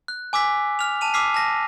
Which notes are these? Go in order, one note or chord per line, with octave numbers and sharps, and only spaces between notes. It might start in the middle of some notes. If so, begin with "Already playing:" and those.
F#6
G#5 D6 E6 B6
F6 F7
A5 D#7 F7
D6 E6 F6 B6 C7
A5 A#6